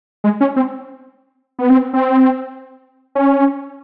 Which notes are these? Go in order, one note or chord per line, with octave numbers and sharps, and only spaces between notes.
G#3
C#4
C4
B3
C4
C4
C#4